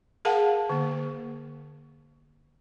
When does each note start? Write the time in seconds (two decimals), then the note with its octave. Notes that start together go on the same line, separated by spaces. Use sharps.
0.25 G#4 A#4 F5 F#5 A5
0.70 D3 A#3